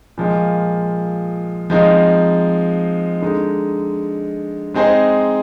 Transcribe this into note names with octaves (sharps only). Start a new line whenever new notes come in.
A#2 F3 G#3
F3 G#3 C4 D#4
D3 G#3 D#4
G#3 C4 D#4 G#4 C5